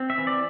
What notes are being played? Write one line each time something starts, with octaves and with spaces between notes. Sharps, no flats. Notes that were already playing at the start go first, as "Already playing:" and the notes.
Already playing: C4
E5
E3
D5